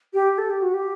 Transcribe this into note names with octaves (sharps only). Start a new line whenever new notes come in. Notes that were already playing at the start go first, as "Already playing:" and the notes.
G4
A4
G4
F#4
G4